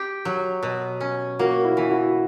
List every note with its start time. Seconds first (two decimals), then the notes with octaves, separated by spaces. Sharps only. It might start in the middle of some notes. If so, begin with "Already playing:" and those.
Already playing: G4
0.25 F#3
0.63 B2
1.00 C#4
1.39 A#3 F#4
1.64 E4
1.72 F#4
1.77 E3 E4
1.90 F#4